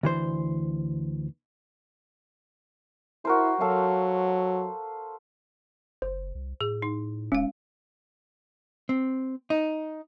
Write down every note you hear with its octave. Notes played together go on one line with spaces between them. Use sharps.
D2 E3 C5
E4 F#4 A#4 C5
F#3 A4 F5
F#1 C5
C2
A2 G#4
D#4
D#1 G#3 C#4 F5
C4
D#4